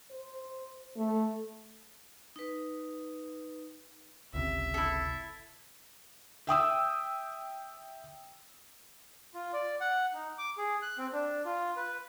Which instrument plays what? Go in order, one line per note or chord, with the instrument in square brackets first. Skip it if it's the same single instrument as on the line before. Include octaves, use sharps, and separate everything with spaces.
[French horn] C5
A3
[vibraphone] D#4 B4
[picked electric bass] G1 C#2 C3 [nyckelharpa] E5
[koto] E4 A4
[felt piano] E5 G5 D#6 E6
[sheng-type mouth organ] F4
D5
F#5
D#4
D6
G#4
F#6
C4
D4
F4
B4